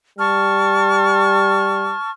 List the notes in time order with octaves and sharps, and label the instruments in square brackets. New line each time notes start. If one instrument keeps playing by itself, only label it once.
[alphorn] G3 [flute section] A5 C#6 F6